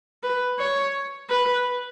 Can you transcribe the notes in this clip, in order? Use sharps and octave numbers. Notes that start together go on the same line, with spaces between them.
B4
C#5
B4